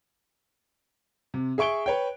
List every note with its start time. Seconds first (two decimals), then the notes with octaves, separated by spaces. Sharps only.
1.34 C3
1.58 G#4 E5 C#6 D7 G7
1.86 B4 C#5 G5